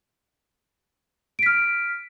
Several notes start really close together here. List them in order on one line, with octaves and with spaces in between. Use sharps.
D7 B6 F6